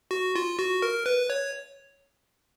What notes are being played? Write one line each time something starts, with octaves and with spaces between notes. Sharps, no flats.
F#4
F4
F#4
A#4
B4
C#5